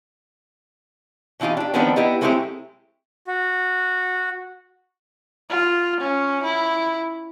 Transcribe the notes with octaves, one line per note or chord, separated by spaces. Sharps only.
B2 E3 D#4 F4 G4
D4 G4
D#3 F3 G#3 B3 C4 D4
B3 E4 G4 D#5
F#3 G#3 A3 C4 E4 G4
F#4
F4
C#4
E4